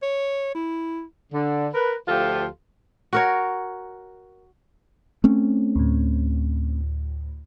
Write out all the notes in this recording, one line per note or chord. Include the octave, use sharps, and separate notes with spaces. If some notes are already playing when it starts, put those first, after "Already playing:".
C#5
E4
D3
A#4 B4
D2 F3 F4 G4 A4
F#4 A#4 C#5
A3 C4 C#4
D2 A2